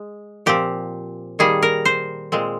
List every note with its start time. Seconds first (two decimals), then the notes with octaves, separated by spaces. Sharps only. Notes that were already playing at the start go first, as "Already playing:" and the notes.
Already playing: G#3
0.46 A#2 F3 C4 G4
1.39 D#3 G3 A#3 G#4
1.62 A#4
1.85 C5
2.32 A#2 G#3 C4